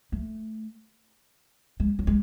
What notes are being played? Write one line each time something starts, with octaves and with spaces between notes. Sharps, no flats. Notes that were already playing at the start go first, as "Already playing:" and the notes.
A3
G#3
F#3
G#3